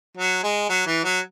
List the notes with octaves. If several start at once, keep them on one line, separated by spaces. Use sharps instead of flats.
F#3
G#3
F#3
E3
F#3